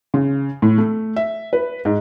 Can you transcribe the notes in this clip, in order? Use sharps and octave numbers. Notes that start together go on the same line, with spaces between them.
C#3
A2
A3
E5
B4
G#2